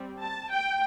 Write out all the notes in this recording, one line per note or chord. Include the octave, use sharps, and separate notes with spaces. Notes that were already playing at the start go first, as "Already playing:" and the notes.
Already playing: G3 C4
A5
G5